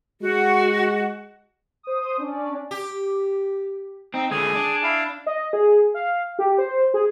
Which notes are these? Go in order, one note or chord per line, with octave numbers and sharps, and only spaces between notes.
G#3 F#4
C5 D#6
C#4 D4 D5
G4
C4 D#4
D3 G#3 G#4 G#5
D4
E4 F5
D#5
G#4
F5
G4
C5
G#4